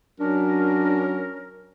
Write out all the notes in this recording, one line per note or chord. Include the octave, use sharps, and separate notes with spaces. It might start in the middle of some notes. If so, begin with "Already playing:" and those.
F#3 C#4 D4 A#4